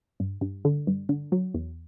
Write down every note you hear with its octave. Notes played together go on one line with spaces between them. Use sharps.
G2
G2
D3
G2
D3
F#3
E2